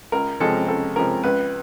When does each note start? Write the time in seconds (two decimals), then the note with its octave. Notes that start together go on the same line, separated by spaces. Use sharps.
0.12 C#2 A#4
0.40 C3 F3 G#3 C#4 A4
0.68 C#2 A4
0.96 C3 F3 G#3 C#4 A#4
1.24 C#2 B4